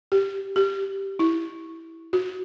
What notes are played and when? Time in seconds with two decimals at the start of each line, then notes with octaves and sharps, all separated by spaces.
0.12 G4
0.56 G4
1.19 E4
2.13 F#4